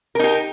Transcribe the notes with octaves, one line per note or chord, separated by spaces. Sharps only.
D#4 G4 A#4